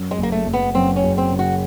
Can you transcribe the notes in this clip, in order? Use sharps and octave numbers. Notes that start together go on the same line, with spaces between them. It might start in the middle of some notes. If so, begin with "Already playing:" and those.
Already playing: F#2
G#3
F#1
A#3
A3
F#1
B3
F#2 C4
C#4
F#1
C4
C#3
F#4